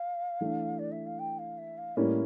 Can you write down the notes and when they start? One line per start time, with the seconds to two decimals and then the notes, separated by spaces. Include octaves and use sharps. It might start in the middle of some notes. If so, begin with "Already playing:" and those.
Already playing: F5
0.41 E3 A3 D4
0.79 D5
0.91 E5
1.06 F5
1.19 G5
1.38 F5
1.58 E5
1.78 F5
1.96 A2 G3 A#3 C#4 E4 D5